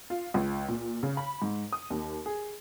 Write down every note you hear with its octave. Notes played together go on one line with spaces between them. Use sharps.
F4
C#2
A#2
C#3
B5
G#2
D#6
D#2
G#4